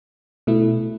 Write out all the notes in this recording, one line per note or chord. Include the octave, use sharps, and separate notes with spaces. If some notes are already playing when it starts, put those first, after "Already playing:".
B2 A3 E4